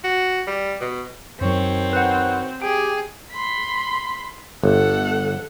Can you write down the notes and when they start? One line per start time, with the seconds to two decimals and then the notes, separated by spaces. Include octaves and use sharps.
0.04 F#4
0.47 G3
0.81 B2
1.41 F#2 D#3 F#3 C4 F#4 C#5
1.93 B4 F#5
2.62 G4 G#4 G5
3.32 B5 C6
4.64 G1 A4 F#5